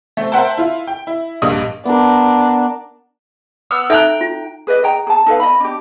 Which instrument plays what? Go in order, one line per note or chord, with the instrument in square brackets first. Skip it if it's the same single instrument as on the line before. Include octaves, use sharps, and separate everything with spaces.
[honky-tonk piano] A3 C4
A#4 C5 E5 F#5 G5 A5
E4 F4
G5
E4
A#1 G2 A#3 D#5 D#6
[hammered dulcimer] B3 A#4 [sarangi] D4
[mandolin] B3 E6 F6
[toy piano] D#4 A4 E5 [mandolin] G5 A#5 F#6
[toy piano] F4
[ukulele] G#4 B4 D5 D#5
G#4 G5 A#5
G#4 A5
D#4 A4 B4 F5
D#5 B5
D4 G4